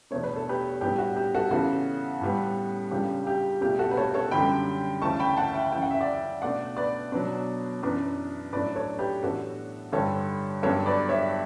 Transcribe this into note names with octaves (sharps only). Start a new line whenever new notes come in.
E2 B2 A3 D4 C#5
B4
A4
G4 B4
A2 G3 B3 D4 G4
F#4
G4
F#4 A4
C#3 E3 B3 F#4 A4
A2 G3 B3
C#2 C#3 G3 D4 G4
G4
C#2 B2 A3 D4 G4
F#4 A4
B4
A4 C#5
A4 C#5
F#2 D3 G3 G5 B5
D2 C#3 E3 A3 A5 C#6
G5 B5
F#5 A5
E5 G5
F#2 C#3 E3 G5
F#5
E5
D5 F#5
B2 A3 D4 D5 F#5
B4 D5
B2 F#3 B3 D4
F#2 E3 B3 D4
A2 F#3 A3 D4 B4 D5
A4 C#5
G4 B4
A2 E3 B3 D4 F#4 A4
G2 D3 G3 A4 C#5
G2 F#3 B3 D4 A4 C#5
B4 D5
C#5 E5